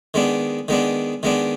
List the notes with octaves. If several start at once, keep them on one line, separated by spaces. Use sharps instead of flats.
D#3 G#3 B3 D4
D#3 G#3 B3 D4
D#3 G#3 B3 D4